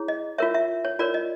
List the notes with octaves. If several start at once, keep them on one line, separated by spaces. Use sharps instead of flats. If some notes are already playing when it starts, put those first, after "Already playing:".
Already playing: E4 G#4 C#5
D#5
F4 A#4 C#5 E5
E5
C#5
F4 A#4 C#5 D5
D#5